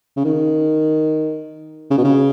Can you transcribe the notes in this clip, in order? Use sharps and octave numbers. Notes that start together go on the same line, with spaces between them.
C#3
D#3
C#3
B2
C#3